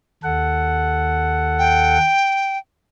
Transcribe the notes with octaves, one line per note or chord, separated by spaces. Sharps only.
D#2 A4 F#5
G5